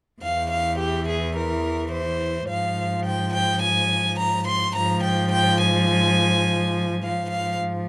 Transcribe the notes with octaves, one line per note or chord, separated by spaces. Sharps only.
E2 E3 F5
F5
G4
G#4
A#4
C5
G#2 F3 F5
G5
G5
G#5
A#5
C6
G#2 F3 A#5
G5
G5
G#5
G#2 F3 F5
F5